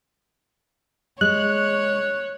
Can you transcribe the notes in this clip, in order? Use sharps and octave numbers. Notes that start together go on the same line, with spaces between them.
G#3 C#5 F#6